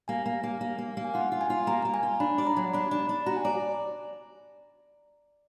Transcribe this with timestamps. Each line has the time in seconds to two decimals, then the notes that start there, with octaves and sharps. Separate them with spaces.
0.08 A#3 G#5
0.26 A#3
0.43 A#3
0.61 A#3
0.79 A#3
0.97 A#3
1.05 G#5
1.14 F4 F#5
1.32 F4
1.41 G#5
1.50 F4
1.67 A#3 A#5
1.82 A#3 A#5
1.94 G#5
2.03 F4
2.20 D4 B5
2.38 D5
2.47 A#5
2.56 F#3
2.74 D4 B5
2.91 D4
3.09 D4
3.26 F#4 A#5
3.37 G#5
3.45 D5 A#5